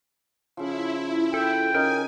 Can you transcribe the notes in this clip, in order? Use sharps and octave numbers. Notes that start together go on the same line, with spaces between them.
C#3 F3 E4
A4 G5
C#3 D#4 A#4 G#5